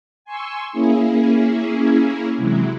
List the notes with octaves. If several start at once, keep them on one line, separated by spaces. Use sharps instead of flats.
G#5 C6 C#6 E6
A#3 C#4 E4 G#4
C3 E3 F#3 G#3 E4